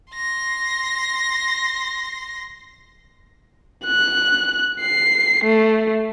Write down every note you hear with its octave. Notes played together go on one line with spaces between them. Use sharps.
C6 A#6
F#6
C7
A3